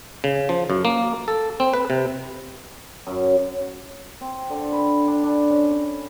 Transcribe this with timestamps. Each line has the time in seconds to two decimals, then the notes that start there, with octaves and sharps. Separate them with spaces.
0.24 C#3
0.49 F3
0.70 F#2
0.85 A#3
1.28 A4
1.60 C4
1.74 B4
1.90 C3
3.07 F#2
4.21 C4
4.50 D3
4.72 B4
5.07 D4
5.23 D4
5.51 C#4
5.71 C#4